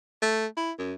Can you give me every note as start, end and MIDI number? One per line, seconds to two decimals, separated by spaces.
0.22 0.46 57
0.57 0.72 64
0.79 0.94 42